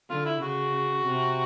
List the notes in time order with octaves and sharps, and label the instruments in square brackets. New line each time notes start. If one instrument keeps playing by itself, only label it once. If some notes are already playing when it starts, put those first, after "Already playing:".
[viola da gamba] D3 [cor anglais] F4
[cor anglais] E4
[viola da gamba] C#3 [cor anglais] F#4
[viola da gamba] C3